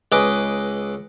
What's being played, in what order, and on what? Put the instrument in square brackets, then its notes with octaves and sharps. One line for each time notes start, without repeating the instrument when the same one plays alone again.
[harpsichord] C#2 G#4 B4 D#5 D6